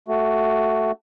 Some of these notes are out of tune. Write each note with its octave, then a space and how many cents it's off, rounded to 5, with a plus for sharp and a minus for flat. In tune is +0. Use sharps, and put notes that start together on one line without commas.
A3 +0 F#4 +10